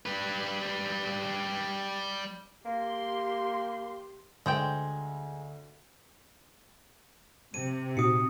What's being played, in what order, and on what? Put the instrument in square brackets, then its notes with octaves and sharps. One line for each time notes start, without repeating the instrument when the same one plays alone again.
[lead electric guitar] G3 B4
[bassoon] A#3 [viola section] G4 C6
[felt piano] D2 [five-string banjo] G#3 C5 G5
[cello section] C3 [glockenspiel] D#7
[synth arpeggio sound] A#2 D#4 F#4 [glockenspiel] D#6 C#7